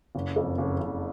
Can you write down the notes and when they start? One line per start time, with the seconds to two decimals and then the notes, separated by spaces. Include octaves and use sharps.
0.15 F#1
0.36 F2
0.58 F#1
0.80 F#1